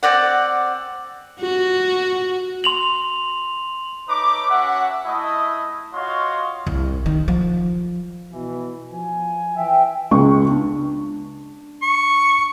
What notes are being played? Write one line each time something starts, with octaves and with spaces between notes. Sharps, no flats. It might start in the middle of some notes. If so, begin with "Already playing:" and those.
C4 D5 F#5
F#4
C6 F7 F#7
A3 D#4 B4 C#5 D6
C#4 F#4 E5 F#5
A3 E4 D#5
F4 F#4 C#5 D#5 F5 C6
C2
D#3
F3
B2 E3
F3 G#5
E3 E5 G5
C#2 G#3 C#6
D4
C#6